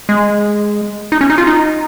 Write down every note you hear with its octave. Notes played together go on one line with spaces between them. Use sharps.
G#3
D#4
C#4
D#4
F4
D#4